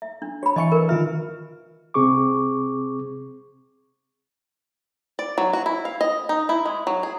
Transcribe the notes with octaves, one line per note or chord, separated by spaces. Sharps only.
E5
D4
F#4 C#5 B5
E3 D#5 E5 G#5 C#6 C#7
A#4 B4
D#3 F4 E5 F6
C3 C4 G#4 C#6 D6
D5
F#3
F#4
E4
F5
D#5
D#4
E4
G#3
F#3
G#4